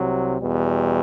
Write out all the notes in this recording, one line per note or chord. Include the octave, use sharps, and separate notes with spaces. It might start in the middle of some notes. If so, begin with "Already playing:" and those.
Already playing: C2 C3 F#3
E2 B2 G3